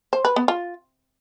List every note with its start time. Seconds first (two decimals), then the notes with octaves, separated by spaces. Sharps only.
0.13 C5
0.25 B4
0.36 B3
0.48 F4